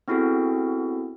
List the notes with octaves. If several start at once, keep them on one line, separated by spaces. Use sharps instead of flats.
B3 C4 E4 F#4 G#4 A4